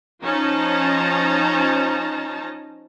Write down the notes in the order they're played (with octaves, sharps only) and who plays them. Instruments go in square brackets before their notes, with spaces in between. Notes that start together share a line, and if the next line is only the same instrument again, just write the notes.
[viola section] F3 C#4 D#4 A5 A#5